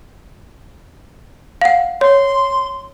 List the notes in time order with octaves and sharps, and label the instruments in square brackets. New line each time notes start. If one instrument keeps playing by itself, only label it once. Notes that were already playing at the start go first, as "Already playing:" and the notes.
[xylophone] F5 F#5
[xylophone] C#5 [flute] C6